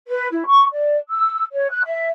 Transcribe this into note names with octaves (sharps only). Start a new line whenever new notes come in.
B4
E4
C#6
D5
E6
C#5
F#6
E5